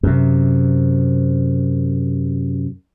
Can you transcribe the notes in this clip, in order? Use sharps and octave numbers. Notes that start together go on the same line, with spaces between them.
F#2 C3